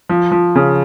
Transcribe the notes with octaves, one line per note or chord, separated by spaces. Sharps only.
F3
F3
C#3